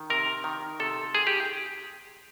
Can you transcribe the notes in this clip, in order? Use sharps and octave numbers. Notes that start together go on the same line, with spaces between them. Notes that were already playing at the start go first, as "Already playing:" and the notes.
Already playing: D#3
C3 A#4
D#3
C3 A4
D#3 G#4
G4